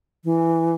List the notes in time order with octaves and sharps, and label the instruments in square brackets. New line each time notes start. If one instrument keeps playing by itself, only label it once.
[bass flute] E3